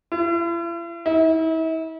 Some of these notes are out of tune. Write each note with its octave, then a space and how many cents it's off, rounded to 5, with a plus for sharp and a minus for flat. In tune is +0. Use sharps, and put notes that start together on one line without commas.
E4 +45
E4 -40